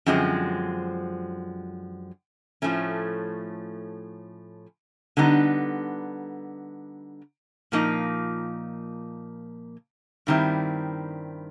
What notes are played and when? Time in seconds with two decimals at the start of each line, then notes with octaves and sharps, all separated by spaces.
0.06 F#2 D3 F3 G#3 C4
2.62 A2 F3 A3 C#4
5.17 D3 G3 B3 D#4
7.72 A#2 F3 A#3 D#4
10.27 G2 D#3 G3 C4 E4